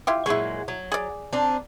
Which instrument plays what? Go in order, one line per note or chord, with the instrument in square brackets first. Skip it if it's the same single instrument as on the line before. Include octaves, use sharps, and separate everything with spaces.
[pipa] E4 F4 G4
[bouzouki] A#2 F#3 G#3 [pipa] E4 C#6
[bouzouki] F#3
[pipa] G#4 D5
[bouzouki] C4 D4 D#4